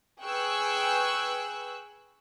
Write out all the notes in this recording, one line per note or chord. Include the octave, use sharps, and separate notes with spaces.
G#4 B4 G5 C#6 E6 F#6